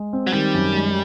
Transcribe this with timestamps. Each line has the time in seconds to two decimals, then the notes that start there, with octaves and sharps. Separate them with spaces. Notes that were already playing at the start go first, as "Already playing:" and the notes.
Already playing: G#3
0.13 C4
0.27 F#3
0.33 D#3 G3
0.54 F#2
0.75 G#3